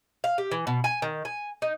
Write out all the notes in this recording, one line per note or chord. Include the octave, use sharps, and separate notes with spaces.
F5
G4
E3
B2
G#5
D#3
G#5
D#4